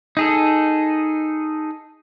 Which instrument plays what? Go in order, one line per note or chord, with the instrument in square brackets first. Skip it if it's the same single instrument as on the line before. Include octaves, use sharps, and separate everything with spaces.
[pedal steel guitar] D#4 G#4 A4